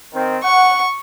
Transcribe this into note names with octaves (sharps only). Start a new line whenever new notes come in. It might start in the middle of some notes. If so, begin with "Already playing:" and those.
D#3 C4
F#5 C#6